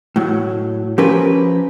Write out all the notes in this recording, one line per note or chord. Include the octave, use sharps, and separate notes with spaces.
A2 F#3
F3 C#4 G4 A#4 B4